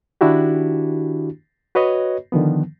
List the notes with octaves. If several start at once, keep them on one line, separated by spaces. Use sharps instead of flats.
D#3 D4 E4 F#4 G4
F#4 B4 C#5 D#5
D3 D#3 F3 B3